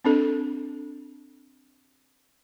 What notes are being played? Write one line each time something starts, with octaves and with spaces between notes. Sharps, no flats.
C4 D4 A4